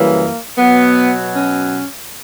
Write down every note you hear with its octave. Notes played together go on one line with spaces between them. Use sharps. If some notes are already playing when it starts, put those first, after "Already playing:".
Already playing: F#2 C#3 E3 G3 A#3
B2 F#3 B3
C#4